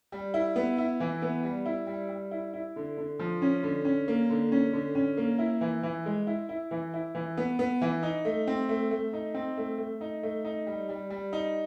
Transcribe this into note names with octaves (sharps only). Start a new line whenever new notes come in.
G3
E4
B3
E4
E3
B3
G3
E4
G3
G3
E4
E4
D3
D3
F3
C#4
D3
C#4
A#3
D3
C#4
D3
C#4
A#3
E4
E3
E3
G#3
E4
E4
E3
E4
E3
B3
B3
E3
D#4
A3
C4
A3
A3
D#4
C4
A3
A3
D#4
A3
D#4
G3
G3
G3
D#4